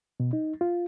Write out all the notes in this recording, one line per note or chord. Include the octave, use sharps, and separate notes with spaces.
B2
D#4
F4